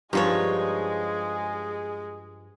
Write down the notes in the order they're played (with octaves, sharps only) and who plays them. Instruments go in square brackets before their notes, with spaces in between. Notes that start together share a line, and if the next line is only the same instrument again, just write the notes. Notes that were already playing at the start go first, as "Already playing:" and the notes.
[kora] G2 F3 F#5 [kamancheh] G#3 G#4 [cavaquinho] D#4 F4 C#5